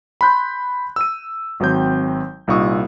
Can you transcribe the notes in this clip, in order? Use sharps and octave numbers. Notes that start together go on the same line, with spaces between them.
B5 C6 F#6 G6
E6 D#7
G#1 F#3 C4 G6
C2 A#2 D#4 C#6 D#6